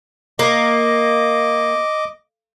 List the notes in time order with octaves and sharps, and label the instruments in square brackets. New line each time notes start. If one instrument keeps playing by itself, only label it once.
[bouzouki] A#3 [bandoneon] D#5 D6